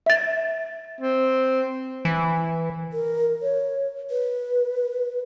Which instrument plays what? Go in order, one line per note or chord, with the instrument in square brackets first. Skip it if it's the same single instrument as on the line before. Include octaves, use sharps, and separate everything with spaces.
[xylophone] E5 A6
[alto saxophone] C4
[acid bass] E3
[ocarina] A#4
C#5
B4